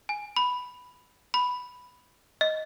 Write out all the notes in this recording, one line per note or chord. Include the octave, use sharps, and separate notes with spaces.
G#5
B5
B5
D#5